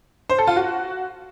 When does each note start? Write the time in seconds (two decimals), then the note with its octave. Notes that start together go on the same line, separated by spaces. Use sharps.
0.30 C5
0.38 A4
0.47 F4
0.56 F#4